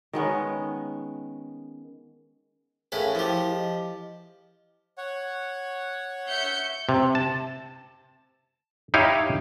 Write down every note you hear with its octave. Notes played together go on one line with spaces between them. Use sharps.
D#3 G#3 B3 C#4
A2 C#4 G#4 A#4 B4 F5
F3 E4 G4
D#5
C#5 F#5
E5 G6 C#7
C3
A5
D#4 E4 G4 C#5 F5